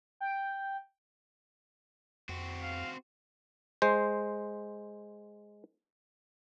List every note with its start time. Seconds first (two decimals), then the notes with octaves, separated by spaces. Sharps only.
0.20 G5
2.29 F2 C4 F#4
2.62 F5
3.82 G#3 C5